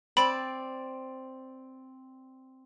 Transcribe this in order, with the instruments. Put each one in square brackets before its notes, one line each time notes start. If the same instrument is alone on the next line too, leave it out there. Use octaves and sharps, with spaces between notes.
[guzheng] C4 D5 [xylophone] B5